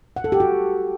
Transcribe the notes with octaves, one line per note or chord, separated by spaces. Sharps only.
F#5
A4
G4
F#4